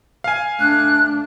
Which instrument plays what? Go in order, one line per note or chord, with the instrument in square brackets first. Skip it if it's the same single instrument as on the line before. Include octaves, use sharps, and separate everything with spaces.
[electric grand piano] F5 G#5
[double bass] A3 D4 [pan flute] F#6